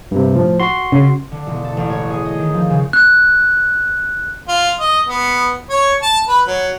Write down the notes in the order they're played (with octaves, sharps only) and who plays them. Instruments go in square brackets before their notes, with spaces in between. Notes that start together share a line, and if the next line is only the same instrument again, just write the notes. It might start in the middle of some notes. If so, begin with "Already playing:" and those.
[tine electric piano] G2 C3
A2 F3
F#4 C6
[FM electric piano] C#3
[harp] D3
E1
A4
A1
C#5
G#4
D#5
D#3
F3
C#3
[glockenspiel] F#6
[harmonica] F4
D#5
B3
C#5
A5
B4
F#3